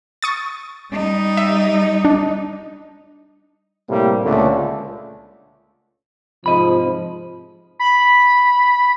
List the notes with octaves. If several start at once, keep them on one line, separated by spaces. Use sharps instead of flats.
C#6 D#6 A6
G3 D#4
E5
D4
A2 C3 G3 A#3
C#2 A#2 D3 A3
G#2 C3 F3 D#5 B5
B5